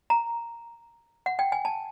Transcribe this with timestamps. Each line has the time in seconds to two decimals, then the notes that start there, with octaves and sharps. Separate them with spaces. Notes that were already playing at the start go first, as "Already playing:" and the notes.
0.10 A#5
1.26 F#5
1.39 G5
1.52 G#5
1.65 A5